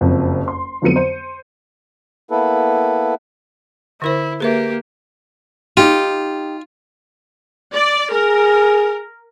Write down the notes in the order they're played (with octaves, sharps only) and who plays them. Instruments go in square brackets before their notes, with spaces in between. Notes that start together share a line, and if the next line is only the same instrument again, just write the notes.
[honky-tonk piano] F#1 F2
C6
F2 D3 F#3 B3 C#7 D#7
C5
[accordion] A#3 B3 E4 A4 B4
[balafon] D3 A#4 C5 [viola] E4
[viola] A#3 G4 [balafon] G#4 B4 E5
[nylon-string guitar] D#4 G4 [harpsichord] F4
[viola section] D5
[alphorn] G#4 [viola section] A#4